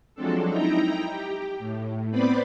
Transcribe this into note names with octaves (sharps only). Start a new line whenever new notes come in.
F3 F#3 G#3 C4 D4 A4
D#4 E4 G5 A#5
G4
A2
B3 C4 B4 C5 D5 B5